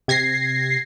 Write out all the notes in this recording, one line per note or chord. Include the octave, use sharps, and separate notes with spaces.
C3 G#6 A#6 C7